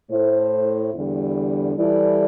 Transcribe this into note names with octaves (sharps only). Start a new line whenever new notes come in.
A2 A3 E4 C5
E2 D3 G3
E3 G3 E4 A4 D5